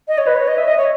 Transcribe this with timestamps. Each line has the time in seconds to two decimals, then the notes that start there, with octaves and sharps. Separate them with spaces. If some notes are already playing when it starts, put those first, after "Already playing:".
0.08 D#5
0.18 C#5
0.27 B4
0.36 C#5
0.47 D#5
0.58 E5
0.68 D#5
0.77 C#5